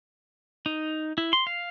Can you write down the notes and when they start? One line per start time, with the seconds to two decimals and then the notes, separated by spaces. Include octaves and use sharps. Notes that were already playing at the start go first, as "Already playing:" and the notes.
0.66 D#4
1.18 E4
1.33 C6
1.47 F5